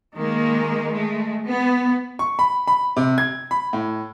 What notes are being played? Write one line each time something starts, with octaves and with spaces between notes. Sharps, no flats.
D#3 G#3 A#3
G#3 A3
B3
C#6
B5
B5
C3
G#6
B5
A2